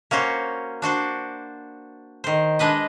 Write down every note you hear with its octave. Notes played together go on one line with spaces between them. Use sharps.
A#3 C#4 F#4 C5
D4 F#4 C5 D5
D#3 C5
G#3 D4 B4 D#5